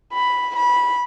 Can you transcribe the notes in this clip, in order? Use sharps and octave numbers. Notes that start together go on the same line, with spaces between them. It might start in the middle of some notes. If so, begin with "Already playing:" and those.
B5
B5